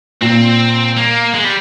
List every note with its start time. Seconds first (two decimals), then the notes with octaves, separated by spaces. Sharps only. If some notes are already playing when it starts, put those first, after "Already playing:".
0.21 A#2 C4
0.97 A#3
1.34 G#3
1.44 G3